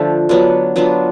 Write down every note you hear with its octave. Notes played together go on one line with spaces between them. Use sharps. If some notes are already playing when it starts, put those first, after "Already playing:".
Already playing: D3 F3 A3
F#3 B3 D4 F4
F#3 B3 D4 F4